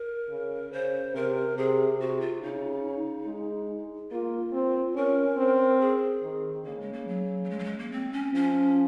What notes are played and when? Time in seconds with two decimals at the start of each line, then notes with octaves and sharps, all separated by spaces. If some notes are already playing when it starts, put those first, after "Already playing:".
Already playing: A#4
0.29 C#3
0.72 C#3 C5
1.14 C3 A#4
1.57 C3 G#4
1.99 C3 F#4
2.20 F4
2.41 C#3 D#4
3.26 G#3
4.11 A#3 F4
4.53 C4
4.95 C#4 A#4
5.37 C4
5.80 G#4
6.23 D#3
6.65 C#3 A#3
6.79 G#3
6.92 A#3
7.07 F#3
7.44 F#3
7.50 G#3
7.59 F#3
7.64 G#3
7.78 A#3
7.91 C4
8.12 C#4
8.34 F3 C#4